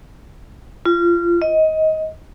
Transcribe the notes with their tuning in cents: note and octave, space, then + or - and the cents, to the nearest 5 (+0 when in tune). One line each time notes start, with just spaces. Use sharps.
F4 -25
D#5 +20